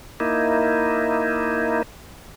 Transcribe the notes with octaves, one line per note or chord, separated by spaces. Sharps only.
A#3 D#4 E4